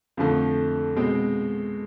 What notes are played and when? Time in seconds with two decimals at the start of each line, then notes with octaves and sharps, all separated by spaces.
0.17 F2 D3 F3 A3
0.96 B2 G#3 C4